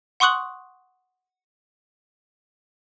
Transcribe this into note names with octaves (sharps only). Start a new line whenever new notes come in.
F#5 C6 C#6 D#6 F#6 F#7